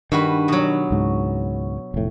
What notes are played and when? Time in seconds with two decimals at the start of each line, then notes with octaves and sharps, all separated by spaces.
0.12 G2 D#3 F#4 B4
0.48 B2 F#3
0.91 C#2 G#2
1.94 F1 A2